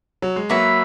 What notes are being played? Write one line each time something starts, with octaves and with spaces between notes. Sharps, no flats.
F#3
G#3
F#3 A#3 F#4 B4 E5